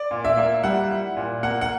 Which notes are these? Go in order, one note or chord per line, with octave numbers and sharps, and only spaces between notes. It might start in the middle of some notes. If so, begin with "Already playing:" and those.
Already playing: D5
A#2
E5
A#3
G3 F#5
E4
A#2
A#3 F#5
F#5